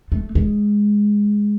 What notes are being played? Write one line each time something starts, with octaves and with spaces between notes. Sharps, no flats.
A3
G#3